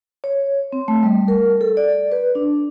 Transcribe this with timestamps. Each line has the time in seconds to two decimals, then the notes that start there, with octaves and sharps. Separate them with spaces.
0.24 C#5
0.73 C4
0.88 A3
1.03 G3
1.28 A#4
1.61 A4
1.77 D5
2.12 B4
2.35 D4